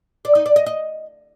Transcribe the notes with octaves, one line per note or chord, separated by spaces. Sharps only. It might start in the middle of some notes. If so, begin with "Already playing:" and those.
D5
D#4
D5
D#5
D#5